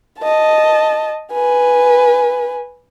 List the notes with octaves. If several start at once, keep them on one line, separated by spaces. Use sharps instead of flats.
D#5 A5
B4 G#5